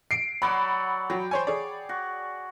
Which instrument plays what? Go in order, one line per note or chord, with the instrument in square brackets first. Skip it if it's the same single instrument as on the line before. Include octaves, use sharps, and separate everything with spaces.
[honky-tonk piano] C7 D7
[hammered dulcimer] F#3 D5 F#5 [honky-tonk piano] B5
[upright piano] F#3 [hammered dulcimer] G5
[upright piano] C5 C#5 G#5
G#4 C#5 D5
[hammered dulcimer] F#4